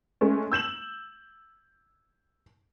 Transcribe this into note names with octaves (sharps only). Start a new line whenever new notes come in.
G#3 A3 C#4
E6 G6 E7 F#7